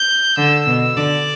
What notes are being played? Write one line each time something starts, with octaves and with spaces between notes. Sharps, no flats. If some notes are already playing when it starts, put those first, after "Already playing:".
Already playing: G6
D3 E6
B2
D3 D5